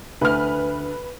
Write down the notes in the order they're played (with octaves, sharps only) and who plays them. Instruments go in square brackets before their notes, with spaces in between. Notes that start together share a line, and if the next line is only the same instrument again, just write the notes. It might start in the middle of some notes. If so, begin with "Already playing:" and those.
[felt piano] D2 [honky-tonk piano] B4 F6